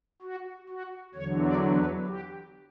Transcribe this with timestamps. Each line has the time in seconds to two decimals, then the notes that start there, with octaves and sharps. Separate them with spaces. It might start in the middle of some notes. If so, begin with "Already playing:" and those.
0.22 F#4
0.69 F#4
1.15 E2 D3 F#3 C#5
1.46 D5
1.76 B4
2.07 G4